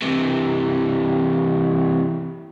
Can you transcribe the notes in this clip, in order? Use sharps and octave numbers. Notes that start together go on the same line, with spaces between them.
C3 E3